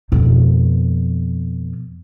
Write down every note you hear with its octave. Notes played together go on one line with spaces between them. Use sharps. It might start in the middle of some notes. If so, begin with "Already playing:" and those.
F2 B2